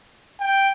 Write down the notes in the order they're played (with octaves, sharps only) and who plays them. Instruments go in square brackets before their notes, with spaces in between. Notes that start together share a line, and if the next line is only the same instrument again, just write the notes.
[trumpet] G5